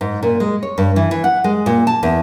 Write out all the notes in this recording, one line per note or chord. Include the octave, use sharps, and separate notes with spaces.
G#2
A#2
G#3
C#5
G2
E3
E3
F#5
G#3
A#2
A5
E2